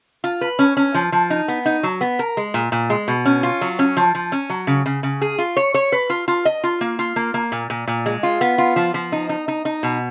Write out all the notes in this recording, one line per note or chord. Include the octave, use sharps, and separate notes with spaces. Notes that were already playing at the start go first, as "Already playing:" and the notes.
F4
B4
C#4
C#4
F3
F3
D#4
B3
D#4
F#3
B3
A#4
G#3
A#2
A#2
G#3
B2
C#4
F4
F#3
C#4
F3
F3
C#4
F#3
C#3
C#3
C#3
G#4
F4
C#5
C#5
B4
F4
F4
D#5
F4
A#3
F4
A#3
A#3
A#2
A#2
A#2
G#3
F4
B3
F4
F3
F3
D#4
D#4
D#4
D#4
B2